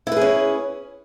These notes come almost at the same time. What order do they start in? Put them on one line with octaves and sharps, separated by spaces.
E4 B4 G#4 C#4